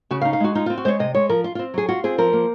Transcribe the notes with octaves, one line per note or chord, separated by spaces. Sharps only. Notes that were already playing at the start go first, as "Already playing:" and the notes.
C#3 F#4
F5
D#4
F5
G#3 F#4
D#4 F4
F4
C4
F#4
G#3 C5 C#5
C3 D#5
G#3 C#5
F3 A#4
F4
F4
C4
F#3 G#4
F4 F#4
C4 G#4
F3 A#4
A#3